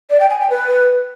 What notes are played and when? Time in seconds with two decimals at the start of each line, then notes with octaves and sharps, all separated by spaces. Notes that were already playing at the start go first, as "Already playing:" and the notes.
0.10 D5
0.20 G5
0.30 G#5
0.40 G5
0.50 B4